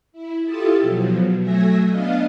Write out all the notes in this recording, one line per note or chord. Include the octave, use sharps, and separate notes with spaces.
E4
E4 F4 G4 A4 A5 D#6
B2 F3 F#3
F#3 A3 E5 G#5 A#6
B3 D4 D#5 F5